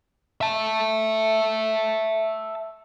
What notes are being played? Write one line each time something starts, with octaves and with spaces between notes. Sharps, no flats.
E5 A5